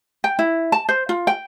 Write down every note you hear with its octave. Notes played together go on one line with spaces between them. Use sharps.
G5
E4
A5
C5
F4
G5